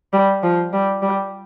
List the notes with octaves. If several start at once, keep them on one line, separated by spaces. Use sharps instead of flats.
G3
F3
G3
G3